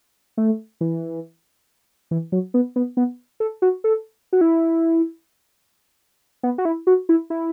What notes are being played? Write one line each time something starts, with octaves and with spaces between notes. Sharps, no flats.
A3
E3
E3
F#3
B3
B3
B3
A4
F#4
A4
F#4
E4
B3
F#4
E4
F#4
E4
E4